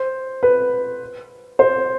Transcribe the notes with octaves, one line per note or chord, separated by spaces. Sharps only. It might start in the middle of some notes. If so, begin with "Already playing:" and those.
Already playing: C5
B4
C5